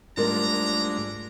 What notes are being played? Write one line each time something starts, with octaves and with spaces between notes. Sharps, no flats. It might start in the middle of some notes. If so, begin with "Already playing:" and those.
G#2 G3 A3 D4 F4 A#4 D5 A#5